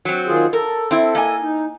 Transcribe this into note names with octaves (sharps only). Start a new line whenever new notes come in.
F#3 C4
D#3 F4 G#4
A4 A#4
C4 E4
A#3 D#5 G#5
D#4